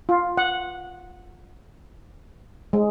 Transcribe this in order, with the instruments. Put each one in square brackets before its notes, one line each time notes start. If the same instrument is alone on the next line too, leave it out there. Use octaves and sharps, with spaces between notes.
[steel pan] F4
F#5
G#3